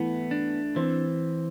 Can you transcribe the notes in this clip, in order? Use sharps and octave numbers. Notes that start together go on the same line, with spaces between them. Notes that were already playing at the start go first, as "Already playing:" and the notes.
Already playing: E3 A3 B3
D4
E3 C4